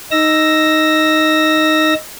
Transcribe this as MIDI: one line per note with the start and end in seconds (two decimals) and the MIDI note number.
0.11 1.94 63
0.11 1.94 88
0.11 1.94 94